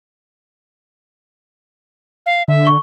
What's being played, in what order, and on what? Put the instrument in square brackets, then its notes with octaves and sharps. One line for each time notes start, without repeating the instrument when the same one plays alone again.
[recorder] F5
[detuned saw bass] D3 [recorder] E5
[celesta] C#6 G7